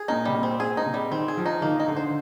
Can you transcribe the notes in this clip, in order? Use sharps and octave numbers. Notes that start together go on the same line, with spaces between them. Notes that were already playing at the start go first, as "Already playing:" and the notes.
Already playing: G#4
A#2 D#4
C3 G3
A#2
C4
A#2 G#4
D#4
C3
G3
D#3 C4
G#4
F3
D#4
D#3 A#3
D#4
D3
C5